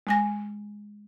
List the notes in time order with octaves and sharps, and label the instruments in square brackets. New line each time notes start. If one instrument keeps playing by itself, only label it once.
[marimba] G#3 G#5 A#6